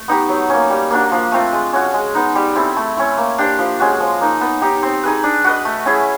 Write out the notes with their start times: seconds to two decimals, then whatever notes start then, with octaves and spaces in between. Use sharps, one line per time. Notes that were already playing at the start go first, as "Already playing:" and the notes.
Already playing: A3
0.08 B3 D#4 G4
0.29 F#3
0.50 A#3 C#4
0.70 G3
0.90 A#3 D4 F#4
1.12 F3
1.32 A3 C4 F4
1.53 G#3
1.73 C#4 F#4
1.94 G#3
2.15 B3 D#4
2.35 G3
2.55 C4 E4 A4
2.76 A3
2.97 C#4 E4
3.17 A#3
3.38 D4 G4 C5
3.59 F3
3.80 G#3 C#4 F#4
4.00 F3
4.21 A#3 D#4
4.41 B3
4.61 D#4 G4
4.83 C4
5.03 D#4 G#4 B4
5.23 D4
5.44 F#4 B4 D#5
5.65 A3
5.85 C#4 E4 G#4